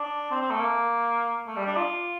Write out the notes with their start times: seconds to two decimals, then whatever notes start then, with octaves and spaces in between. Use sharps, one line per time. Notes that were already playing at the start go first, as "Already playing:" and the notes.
Already playing: D4
0.31 C4
0.41 C4
0.50 A3
0.60 A#3
1.47 A3
1.56 G3
1.66 D4
1.76 F4